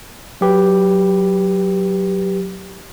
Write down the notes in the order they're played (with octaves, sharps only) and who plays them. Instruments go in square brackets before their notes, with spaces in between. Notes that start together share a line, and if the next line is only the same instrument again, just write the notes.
[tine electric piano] F#3 G4 B4